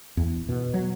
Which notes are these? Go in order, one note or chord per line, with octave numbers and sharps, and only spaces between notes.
E2
B2
F#3